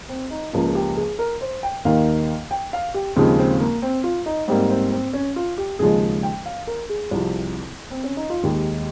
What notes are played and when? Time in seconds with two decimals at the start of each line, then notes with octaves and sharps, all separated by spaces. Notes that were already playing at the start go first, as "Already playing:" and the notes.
0.09 C4
0.31 D#4
0.53 C#2 C#3 F3 A#3 F4
0.68 G#4
0.75 G4
0.97 G#4
1.19 A#4
1.41 C5
1.63 G5
1.85 D#2 D#3 A#3 F5
2.51 G5
2.73 F5
2.94 G4
3.16 D#2 C#3 F3 G#3 C4
3.38 C4
3.60 A#3
3.82 C4
4.04 F4
4.26 D#4
4.48 G#2 G3 A#3 C4
4.70 C4
4.92 C4
5.13 C#4
5.36 F4
5.58 G4
5.79 D#2 C#3 F3 G#3 G#4
6.02 G#4
6.23 G5
6.46 F5
6.67 A#4
6.89 G#4
7.11 C2 C3 F3
7.91 C4
8.03 C#4
8.17 D#4
8.30 F4
8.43 D#2 D#3 G#3 G4